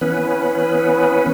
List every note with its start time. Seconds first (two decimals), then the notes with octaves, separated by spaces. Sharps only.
0.01 E3 B3 C#4 B4